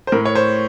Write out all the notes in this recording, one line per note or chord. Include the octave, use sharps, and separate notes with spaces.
C5
A2 A#4
C#5
C5